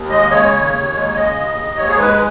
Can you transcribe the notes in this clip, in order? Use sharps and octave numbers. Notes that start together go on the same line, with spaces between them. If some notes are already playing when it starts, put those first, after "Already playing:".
Already playing: D#2
G#3 D#5
C#3 C#5
D#2
D#2
G#3
C#3 D#5
D#2
D#2
G#2 C#5
G#4
G#3 B4